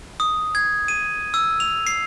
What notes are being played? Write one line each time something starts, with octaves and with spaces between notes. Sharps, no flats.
D#6
G#6
D#7
E6
F7
C7